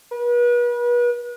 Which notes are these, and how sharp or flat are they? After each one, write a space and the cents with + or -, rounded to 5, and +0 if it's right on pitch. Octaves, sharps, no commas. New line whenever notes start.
B4 -35